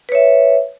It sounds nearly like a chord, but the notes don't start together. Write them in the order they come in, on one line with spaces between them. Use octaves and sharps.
B4 C#5 E5